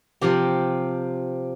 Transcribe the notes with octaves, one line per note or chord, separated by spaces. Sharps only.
C3 F3 C4 G4